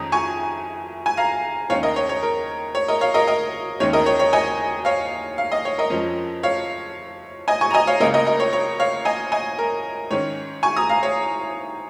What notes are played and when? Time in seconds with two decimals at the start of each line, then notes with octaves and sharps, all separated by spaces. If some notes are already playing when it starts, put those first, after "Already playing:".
Already playing: F2 D#3 G#3 C#4 A#5 D#6
0.12 G#5 C#6
1.06 G#5
1.17 F5 A#5
1.70 D#2 D#3 G#3 C#4 C#5 F5
1.83 A#4 D#5
1.96 C#5
2.09 C#5
2.23 A#4
2.75 C#5
2.88 A#4 D#5
3.01 C#5 F5
3.14 A#4 D#5
3.27 A#4 D#5
3.80 D#2 D#3 G#3 C#4 C#5
3.93 A#4 D#5
4.06 C#5
4.19 C#5
4.33 D#5 G#5
4.85 C#5 F5
5.38 F5
5.52 D#5
5.65 C#5
5.78 A#4 D#5
5.90 F2 F3 G#3 C#4
6.43 C#5 F5
7.48 D#5 G#5
7.61 G#5 C#6
7.70 A#5
7.74 D#5 G#5
7.87 C#5 F5
8.00 C#2 C#3 A#3 C#4 A#4 D#5
8.14 A#4 D#5
8.26 A#4 D#5
8.40 C#5
8.53 C#5
8.80 C#5 F5
9.05 D#5 G#5
9.32 D#5 G#5
9.58 A#4
10.10 G#2 D#3 C#4 C#5
10.63 G#5 C#6
10.76 A#5 D#6
10.89 F5 A#5
11.03 C#5